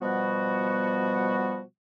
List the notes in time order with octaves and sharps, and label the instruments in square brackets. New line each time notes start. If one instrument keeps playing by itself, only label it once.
[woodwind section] B2 F3 G3 B3 F#4